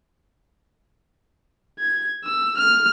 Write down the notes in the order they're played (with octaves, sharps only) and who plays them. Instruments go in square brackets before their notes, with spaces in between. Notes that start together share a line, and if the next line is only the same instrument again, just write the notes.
[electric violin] G#6
E6
F6